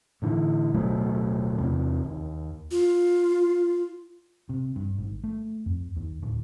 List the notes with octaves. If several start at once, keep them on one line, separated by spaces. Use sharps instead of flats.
A2 D3 E3
D1 B2 F#3 A3
E2 C3
D#2
F4
C3
G2
G#1
A3
F2
D#2
D1